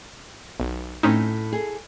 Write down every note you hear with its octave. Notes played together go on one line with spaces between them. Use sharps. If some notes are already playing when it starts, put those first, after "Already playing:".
B1
A2 C4 C#4 D#4
G#4 A4